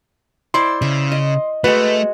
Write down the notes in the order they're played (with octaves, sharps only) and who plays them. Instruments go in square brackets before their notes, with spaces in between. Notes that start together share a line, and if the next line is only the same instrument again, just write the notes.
[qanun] E4 C5 D5 [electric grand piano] C6
[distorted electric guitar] C#3 [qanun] E5
[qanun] D#5
[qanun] G#3 F#4 [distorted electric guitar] A3 [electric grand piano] B4